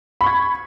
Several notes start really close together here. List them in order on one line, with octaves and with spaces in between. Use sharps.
B5 C#6 G#6